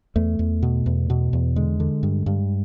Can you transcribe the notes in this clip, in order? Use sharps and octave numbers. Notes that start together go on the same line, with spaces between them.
E2 A3
E2
B2
E2
B2
E2
D3 G#3
D3
G2
G2